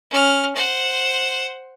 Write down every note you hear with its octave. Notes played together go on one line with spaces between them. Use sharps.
C#4 F6
C5 F#5